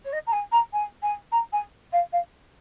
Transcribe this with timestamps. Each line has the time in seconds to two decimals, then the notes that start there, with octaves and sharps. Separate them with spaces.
0.04 C#5
0.12 D#5
0.26 A#5
0.32 G#5
0.52 A#5
0.73 G#5
1.02 G#5
1.32 A#5
1.52 G#5
1.92 F5
2.12 F5